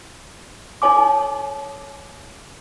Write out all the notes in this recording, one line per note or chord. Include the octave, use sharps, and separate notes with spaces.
D#4 A4 C#5 G#5 D6